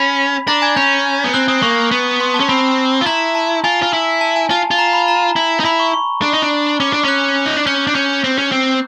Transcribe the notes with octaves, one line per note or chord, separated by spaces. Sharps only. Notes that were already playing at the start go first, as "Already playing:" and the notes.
Already playing: C#4 B5 B6
D4 A#5 A#6
G#5 G#6
C#4 G6
B3
C4 F#6
C4 D#6
A#3 C#6
B3
C6
A5
C#4
C4 B5
F4
E4 A#5
A5
F4 G#5
F4
E4
A5
G#5
F4 A5
F4
A#5
B5
A#5
E4
D#4
E4 B5
C#6
C#6
D4
D#4
D4
C#4 D6
D4
C#4 F#6
D#4
D4
C#4 G6
D4
C#4 G6
C4
C#4
C4